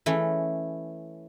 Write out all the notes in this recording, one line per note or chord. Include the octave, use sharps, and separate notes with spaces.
E3 A3 C#4